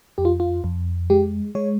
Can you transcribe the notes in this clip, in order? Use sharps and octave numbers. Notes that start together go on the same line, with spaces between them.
F2 G4
F4
F4
F2
G#3 G4
G#3 C#5